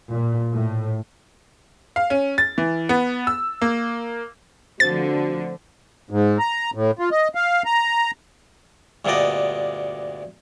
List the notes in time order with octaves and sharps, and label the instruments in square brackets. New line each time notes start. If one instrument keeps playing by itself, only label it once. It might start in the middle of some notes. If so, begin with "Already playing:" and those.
[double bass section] A#2
A2
[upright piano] F5
C#4
A6
E3
B3
E6
A#3
[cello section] D3 F3 [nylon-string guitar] A3 C4 C5 [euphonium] F#4 [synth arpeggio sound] A6
[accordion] G#2
A#5
A2
F4
D#5
F5
A#5
[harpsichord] D2 G2 A#2 B3 D5 D#5